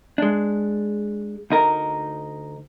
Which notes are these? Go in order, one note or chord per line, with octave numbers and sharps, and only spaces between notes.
G#3 D4
D2 D#4 A#4